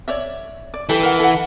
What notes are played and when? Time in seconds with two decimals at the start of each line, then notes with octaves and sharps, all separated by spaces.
0.08 C#5 D5 E5
0.74 D5
0.89 E3 G4 A4
1.03 A#4 F#5
1.19 A4 F#5